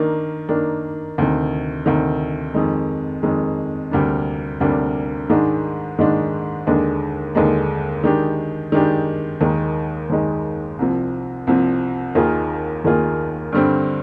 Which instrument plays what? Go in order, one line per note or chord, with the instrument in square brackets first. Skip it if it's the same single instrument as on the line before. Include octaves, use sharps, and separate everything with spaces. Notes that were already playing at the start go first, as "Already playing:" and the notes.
Already playing: [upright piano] D#3 A#3 D4
D#3 A#3 D4
D2 C3 D#3
D2 C3 D#3
F2 D#3 G#3
F2 D#3 G#3
D2 C3 G3 A#3 D4
D2 C3 G3 A#3 D4
G#2 D#3 G#3 D4
G#2 D#3 G#3 D4
D#2 D3 G#3 D4
D#2 D3 G#3 D4
D#3 G#3 D4 G4
D#3 G#3 D4 G4
D#2 D#3 G#3
D#2 D#3 G#3
C2 C3 F3
C2 C3 F3
D#2 D#3 A#3 F4 G#4
D#2 D#3 A#3 F4 G#4
G2 D3 G3 C4